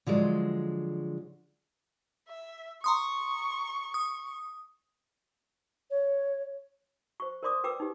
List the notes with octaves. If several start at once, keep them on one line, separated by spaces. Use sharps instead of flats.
D3 F3 F#3 G#3
E5
A#5 C6 C#6 D#6
D#6
C#5
C5 C#6
A#4 C5 D5 C6 D6 D#6
A#4 B4 G5 D6 E6
D#4 G4